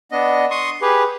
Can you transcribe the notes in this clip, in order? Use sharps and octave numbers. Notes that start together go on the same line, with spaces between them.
B3 D4 D#5
C6 C#6 D#6
G4 G#4 B4